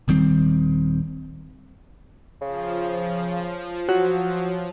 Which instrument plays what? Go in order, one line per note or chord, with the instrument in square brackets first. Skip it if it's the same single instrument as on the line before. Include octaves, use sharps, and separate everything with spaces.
[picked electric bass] D#1 D#3 G3 C4
[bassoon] C#3 [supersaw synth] F3
[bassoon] F#3 [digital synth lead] F#4